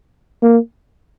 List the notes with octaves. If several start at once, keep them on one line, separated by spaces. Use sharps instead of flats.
A#3